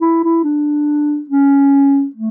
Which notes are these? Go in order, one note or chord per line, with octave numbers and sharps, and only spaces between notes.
E4
E4
D4
C#4
A3